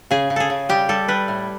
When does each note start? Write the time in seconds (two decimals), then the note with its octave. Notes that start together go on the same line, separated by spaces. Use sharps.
0.11 C#3 G#4
0.30 C#3
0.36 G#4 A4
0.50 C#3
0.69 G3 G4
0.89 G3 A4
1.08 G3 B4
1.28 A2